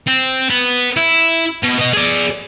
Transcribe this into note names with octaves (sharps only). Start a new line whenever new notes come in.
C4
B3
E4
B2
B2 D#5
G#4 D5